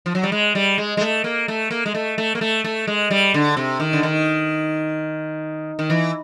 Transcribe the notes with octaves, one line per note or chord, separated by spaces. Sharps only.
F3
F#3
G3
G#3
G3
G#3
G#3
A3
A#3
A3
A#3
G#3
A3
A3
A#3
A3
A3
G#3
G3
D3
C3
D#3
D3
D#3
D#3
E3